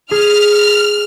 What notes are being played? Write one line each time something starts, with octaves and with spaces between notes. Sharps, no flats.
G#4 F6